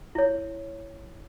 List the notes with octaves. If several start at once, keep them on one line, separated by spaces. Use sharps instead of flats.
E4 C#5